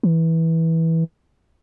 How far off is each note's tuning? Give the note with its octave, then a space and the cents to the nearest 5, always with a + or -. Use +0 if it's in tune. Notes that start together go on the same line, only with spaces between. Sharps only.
E3 -15